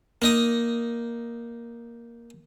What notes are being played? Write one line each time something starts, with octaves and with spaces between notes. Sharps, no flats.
A#3 D#4 D#6